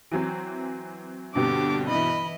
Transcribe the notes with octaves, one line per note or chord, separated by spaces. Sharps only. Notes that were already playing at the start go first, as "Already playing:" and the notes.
E3 F#3 C4
G2 B2 D3 C4 D4 G4 D6
E3 E4 D#5 B5